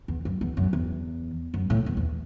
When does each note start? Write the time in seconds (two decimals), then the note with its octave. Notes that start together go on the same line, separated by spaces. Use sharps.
0.08 E2
0.25 F#2
0.41 E2
0.57 F#2
0.73 E2
1.54 F#2
1.70 A2
1.86 E2
1.97 E2